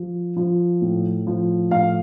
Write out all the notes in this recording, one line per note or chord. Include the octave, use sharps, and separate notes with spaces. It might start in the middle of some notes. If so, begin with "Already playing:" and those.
Already playing: F3
F3
A2
F3
A2 F5